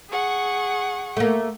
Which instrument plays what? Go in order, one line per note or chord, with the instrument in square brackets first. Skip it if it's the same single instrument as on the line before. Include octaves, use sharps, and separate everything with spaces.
[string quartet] G#4 F#5 C#6
[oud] A3 A#3